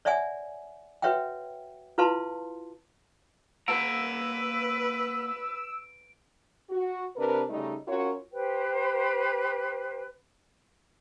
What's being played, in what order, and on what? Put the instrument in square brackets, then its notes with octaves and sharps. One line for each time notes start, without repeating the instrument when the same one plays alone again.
[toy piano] C#5 D5 E5 F#5 G#5
F#4 B4 C#5 E5 F#5 G5
E4 F4 B4 F5 A5 C6
[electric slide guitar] A#3 F#5 A#5 [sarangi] B4 [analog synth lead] E6 [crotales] D7
[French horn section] F#4
C3 D4 A#4 B4
C#3 G3 A3 D#4
C#4 F4 F#4 A#4 C#5
[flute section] G4 B4 C5 G5